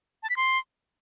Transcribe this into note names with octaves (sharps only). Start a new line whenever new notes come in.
A5
B6
C6